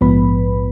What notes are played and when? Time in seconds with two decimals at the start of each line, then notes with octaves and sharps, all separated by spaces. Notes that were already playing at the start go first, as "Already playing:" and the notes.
0.01 A#1 G#2 F3 B3 B4 B5